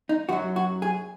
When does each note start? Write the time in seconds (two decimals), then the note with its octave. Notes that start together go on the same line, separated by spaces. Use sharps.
0.09 D#4
0.29 F#2 F#3 F#4
0.56 F#4
0.82 G#4